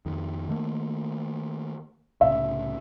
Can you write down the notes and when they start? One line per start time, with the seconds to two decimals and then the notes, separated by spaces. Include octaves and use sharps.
0.06 F2 D#3
0.49 D#3 A3 A#3
2.21 C2 A2 C#3 E5